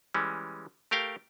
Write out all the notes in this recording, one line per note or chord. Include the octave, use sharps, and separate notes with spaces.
E3 G3 G#3 C#4
A3 G4 A#4 F5 G5